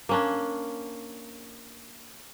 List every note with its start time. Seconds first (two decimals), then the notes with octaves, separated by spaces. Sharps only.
0.09 A#3 C#4 D4